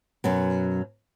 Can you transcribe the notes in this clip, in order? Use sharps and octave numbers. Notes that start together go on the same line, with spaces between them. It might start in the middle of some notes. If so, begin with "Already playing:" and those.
F#2 B2 F#3